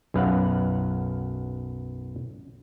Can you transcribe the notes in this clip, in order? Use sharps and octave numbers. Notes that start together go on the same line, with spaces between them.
B1 F#2 B4 F5 F#5